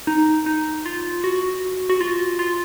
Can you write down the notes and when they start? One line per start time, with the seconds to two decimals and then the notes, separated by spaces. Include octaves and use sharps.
0.07 D#4
0.46 D#4
0.86 F4
1.24 F#4
1.89 F#4
2.01 F4
2.39 F4